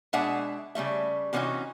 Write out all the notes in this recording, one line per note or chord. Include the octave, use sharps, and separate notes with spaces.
B2 G#3 D4 G#4 E5 F#5
C#3 G3 A3 E5
C3 E3 B3 C#4 D#4 F#4